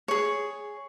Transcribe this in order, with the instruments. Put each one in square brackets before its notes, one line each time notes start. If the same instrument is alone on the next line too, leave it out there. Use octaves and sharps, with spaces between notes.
[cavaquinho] G#4 C#5